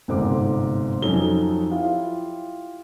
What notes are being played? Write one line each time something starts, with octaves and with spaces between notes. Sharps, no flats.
G1 G#2 C3 C4 A4 D6
F2 F#3 C#4 D#4 A4 G7
E4 F4 G4 F5